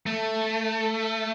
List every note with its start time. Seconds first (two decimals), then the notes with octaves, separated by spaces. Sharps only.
0.06 A3